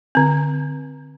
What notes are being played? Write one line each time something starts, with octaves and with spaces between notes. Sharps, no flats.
D3 C4